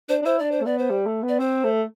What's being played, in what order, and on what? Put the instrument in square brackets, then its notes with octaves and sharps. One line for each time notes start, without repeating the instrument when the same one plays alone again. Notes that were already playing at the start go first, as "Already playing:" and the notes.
[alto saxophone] D4 [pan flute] C5
[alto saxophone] D4
[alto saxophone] E4 [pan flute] C5
[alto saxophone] D4 [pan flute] D5
[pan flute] C5
[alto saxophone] A3
[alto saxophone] B3 [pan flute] D5
[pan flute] C5
[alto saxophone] G3
A3
B3
[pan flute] D5
[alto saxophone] C4 [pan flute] C5
[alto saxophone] A3